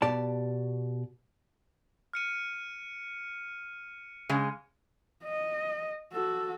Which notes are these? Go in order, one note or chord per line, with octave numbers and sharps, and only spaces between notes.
B2 G4 D5 A5
F6 C#7 D#7
C#3 G#3
D#5
F#4 A4